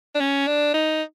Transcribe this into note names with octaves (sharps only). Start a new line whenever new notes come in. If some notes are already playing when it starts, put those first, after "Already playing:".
D4
C#4
D4
D#4